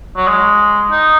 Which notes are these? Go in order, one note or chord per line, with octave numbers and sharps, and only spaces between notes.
F#3
G#3
D#4